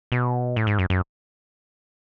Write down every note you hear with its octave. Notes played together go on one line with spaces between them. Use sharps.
B2
A2
G#2
F#2
F#2